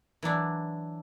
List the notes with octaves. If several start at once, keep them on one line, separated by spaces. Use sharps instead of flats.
E3 F#3 D4 E4